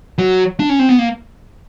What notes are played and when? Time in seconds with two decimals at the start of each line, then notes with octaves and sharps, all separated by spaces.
0.18 F#3
0.60 D4
0.69 C#4
0.79 C4
0.89 B3
0.99 A#3